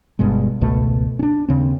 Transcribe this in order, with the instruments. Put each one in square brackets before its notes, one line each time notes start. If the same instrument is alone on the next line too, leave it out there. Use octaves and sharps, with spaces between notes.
[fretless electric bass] G1 G2 B2 G#3
G#1 C#2 B2 A3
C#4 D4
D#2 C#3 C4